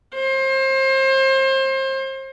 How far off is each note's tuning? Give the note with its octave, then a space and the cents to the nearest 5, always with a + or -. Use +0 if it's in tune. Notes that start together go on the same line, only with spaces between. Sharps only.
C5 +30